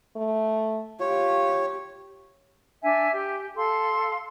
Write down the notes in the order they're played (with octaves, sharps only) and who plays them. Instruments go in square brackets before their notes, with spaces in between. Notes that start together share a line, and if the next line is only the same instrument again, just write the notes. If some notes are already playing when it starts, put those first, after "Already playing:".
[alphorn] A3
[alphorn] F4 [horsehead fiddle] G4 [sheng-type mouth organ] C#5
[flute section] D4 E5 G#5
G4
A4 F5 C6